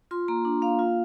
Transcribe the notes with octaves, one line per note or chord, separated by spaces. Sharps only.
F4 C6
A#3 A#5
D4
A#3 F5
F4